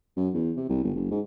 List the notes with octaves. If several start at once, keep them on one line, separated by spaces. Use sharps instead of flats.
F#2
E2
C3
C2
G1
F#1
G#2